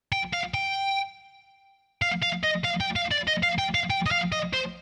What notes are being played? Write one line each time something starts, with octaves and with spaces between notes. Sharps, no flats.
G5
F5
G5
F5
F5
D#5
F5
G5
F5
D5
D#5
F5
G5
F5
G5
D#5
F5
D#5
C5